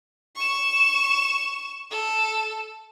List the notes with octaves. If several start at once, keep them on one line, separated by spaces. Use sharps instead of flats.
C#6 E7
A4